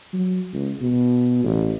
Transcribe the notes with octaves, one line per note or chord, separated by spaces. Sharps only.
F#3
C#2
B2
A1